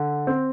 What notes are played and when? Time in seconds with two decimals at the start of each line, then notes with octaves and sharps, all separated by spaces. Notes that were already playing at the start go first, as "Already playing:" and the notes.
Already playing: D3
0.27 C4